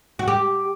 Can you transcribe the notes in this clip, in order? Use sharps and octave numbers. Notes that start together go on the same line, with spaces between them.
F#4
G4